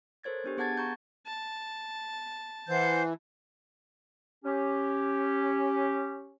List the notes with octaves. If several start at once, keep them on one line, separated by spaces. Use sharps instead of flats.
A4 A#4 C5 C#5 G#6 A6
B3 D4 G4
B3 G#4 F#5 A5 G#6 A6
A#5 C#6 G6
A5
E3 C5 F#5 G6
C#4 G4